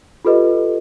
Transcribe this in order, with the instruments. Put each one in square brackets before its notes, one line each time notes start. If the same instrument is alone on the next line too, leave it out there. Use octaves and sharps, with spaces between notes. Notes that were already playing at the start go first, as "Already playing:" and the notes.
[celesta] F4 G4 A4 B4 D#5